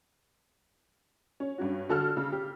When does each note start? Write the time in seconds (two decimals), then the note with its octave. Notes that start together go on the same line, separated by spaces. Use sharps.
1.40 C#4
1.58 G2 C#4 F#4
1.89 D3 F#4 A4 E6 F6
2.17 C#3
2.32 G4